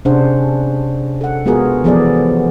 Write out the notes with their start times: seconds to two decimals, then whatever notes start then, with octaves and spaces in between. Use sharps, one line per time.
0.05 C3 C#4 D4 G#4 C5 F#5
1.21 A4 F#5
1.46 G#3 B3 F4 F#4 G#4 A#4
1.84 E3 F3 B3 G#4 A4 D5